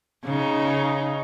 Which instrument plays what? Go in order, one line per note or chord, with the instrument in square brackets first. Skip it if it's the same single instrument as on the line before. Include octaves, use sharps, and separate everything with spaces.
[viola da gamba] C#3 D#4